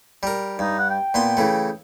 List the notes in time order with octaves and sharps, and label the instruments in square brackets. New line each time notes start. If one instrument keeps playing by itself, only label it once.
[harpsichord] G3 A#4
[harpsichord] G2 [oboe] D#4
[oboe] F#5
G5
[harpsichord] A#2 B3 C6
C#3 E3 A3